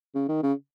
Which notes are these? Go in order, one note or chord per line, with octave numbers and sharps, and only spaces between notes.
C#3
D#3
C#3